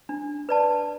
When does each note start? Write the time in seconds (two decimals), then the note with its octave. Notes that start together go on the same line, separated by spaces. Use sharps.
0.09 D4
0.49 B4 D5 A5